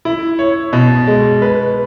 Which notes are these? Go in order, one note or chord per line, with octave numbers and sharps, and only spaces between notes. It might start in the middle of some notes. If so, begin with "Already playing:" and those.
E4
C#5
B2
G#3
B4